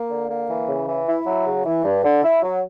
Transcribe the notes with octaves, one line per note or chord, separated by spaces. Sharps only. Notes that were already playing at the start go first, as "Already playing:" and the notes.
Already playing: A#3
D3
A#3
E3
C#3
E3
E4
F#3
C#3
E3
G2
D3
E4
F#3